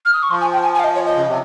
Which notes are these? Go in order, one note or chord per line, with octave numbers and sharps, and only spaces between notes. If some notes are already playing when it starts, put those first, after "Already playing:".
F6
D#6
C#6
F3 C6
G#5
G5
G#5
G#5
F5
D#5
C#5
D#5
C#3
C3